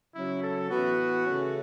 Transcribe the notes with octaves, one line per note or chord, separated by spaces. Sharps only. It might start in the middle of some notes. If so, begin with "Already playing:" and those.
C#3 F#3 C#4 E4
A4
A2 E3 B3 F#4
C#3 A3 C#4